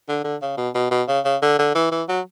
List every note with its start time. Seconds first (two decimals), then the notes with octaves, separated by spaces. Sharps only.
0.08 D3
0.24 D3
0.42 C#3
0.57 B2
0.75 B2
0.91 B2
1.08 C#3
1.25 C#3
1.42 D3
1.59 D3
1.75 E3
1.91 E3
2.09 F#3